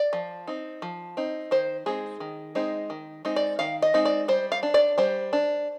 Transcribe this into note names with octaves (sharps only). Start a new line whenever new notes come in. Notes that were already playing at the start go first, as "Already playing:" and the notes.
Already playing: D5
F3
C4 D#4
F3
C4 D#4
D#3 C5
G#3 C4 D#4 G#4
D#3
G#3 C4 D#4
D#3
G#3 C4 D#4
D5
D#3 F5
D#5
G#3 C4 D#4
D5
G3 C5
F5
D4
D5
G3 C5
D4